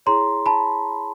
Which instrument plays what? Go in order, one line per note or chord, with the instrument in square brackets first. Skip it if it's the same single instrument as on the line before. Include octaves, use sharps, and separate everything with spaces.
[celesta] E4 G#4 C#5 A#5 C6
A5 B5